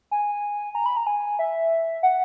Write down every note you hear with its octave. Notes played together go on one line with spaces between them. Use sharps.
G#5
A#5
B5
A#5
G#5
E5
F#5